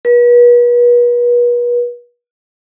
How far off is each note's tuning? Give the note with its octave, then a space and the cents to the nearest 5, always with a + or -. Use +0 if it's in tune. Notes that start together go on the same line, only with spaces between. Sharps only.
B4 -40